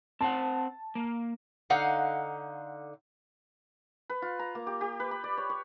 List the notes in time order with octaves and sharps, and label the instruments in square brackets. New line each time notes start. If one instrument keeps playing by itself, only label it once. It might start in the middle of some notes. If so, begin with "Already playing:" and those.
[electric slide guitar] C4 C5 F#5 [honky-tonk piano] A5
[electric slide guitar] A#3
[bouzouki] D3 D#4 F5 F#5
[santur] B4
F4
A#5
A#3
G4
G4
B4
B5
D5
C#5
C#5